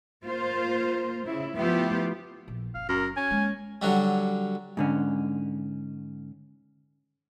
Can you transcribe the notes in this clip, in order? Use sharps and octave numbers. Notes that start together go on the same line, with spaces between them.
A#3 F4 C5
C#3 E4
F3 A3 B3 E4 F4 G4
A#1
F#1 F5
F#2 A#4
C#4 G#5
G#3 A#3
D3 F#3 G3
G#2 D3 C#4